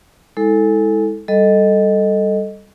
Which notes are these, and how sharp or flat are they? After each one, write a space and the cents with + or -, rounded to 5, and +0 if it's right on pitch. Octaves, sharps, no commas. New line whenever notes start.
G#3 -10 E4 -30 A4 +0
G3 +5 A4 +0 D#5 +0